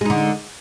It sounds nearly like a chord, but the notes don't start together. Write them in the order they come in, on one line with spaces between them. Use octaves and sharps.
G#3 D#4 D3